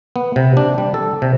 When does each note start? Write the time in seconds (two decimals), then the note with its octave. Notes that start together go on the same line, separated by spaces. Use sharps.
0.16 B3
0.36 C3
0.57 D4
0.78 G3
0.94 A4
1.22 C3